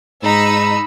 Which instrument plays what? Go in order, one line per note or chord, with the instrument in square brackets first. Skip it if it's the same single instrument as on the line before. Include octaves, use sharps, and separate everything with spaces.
[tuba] G#2 [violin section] D#4 E6 [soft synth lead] B5